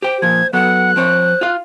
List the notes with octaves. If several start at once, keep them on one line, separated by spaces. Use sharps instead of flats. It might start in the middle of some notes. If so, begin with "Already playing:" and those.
G4 C5 G5
A#2 F3 G#6
F#3 B3 A4 F#5 F#6
F3 C4 C5 C#5
F4 F5